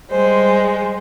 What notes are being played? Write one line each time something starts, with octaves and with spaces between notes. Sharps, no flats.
G3 G#3 C5